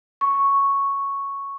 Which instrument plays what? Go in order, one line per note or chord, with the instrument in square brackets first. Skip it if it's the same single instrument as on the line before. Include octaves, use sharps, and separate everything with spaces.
[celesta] C#6